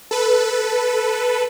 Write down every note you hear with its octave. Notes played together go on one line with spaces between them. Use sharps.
A4 B4